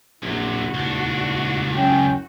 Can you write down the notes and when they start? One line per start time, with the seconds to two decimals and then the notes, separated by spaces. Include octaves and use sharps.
0.23 A#1 F#2 C3 E4 F#4
0.74 D#1 C#2 D4
1.75 F#2 C#4 G5